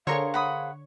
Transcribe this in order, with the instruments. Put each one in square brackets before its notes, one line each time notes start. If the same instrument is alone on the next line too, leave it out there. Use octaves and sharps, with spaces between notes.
[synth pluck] D3 C#5 C#6 [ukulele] G#4 A#4 C5 [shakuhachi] F5
[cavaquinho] F#5 B5 D#6